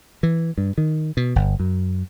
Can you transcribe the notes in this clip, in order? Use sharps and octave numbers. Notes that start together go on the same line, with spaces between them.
E3
G2
D#3
B2
G1
F#2